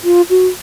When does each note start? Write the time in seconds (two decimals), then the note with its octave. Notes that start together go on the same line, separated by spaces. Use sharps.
0.04 F4
0.30 F#4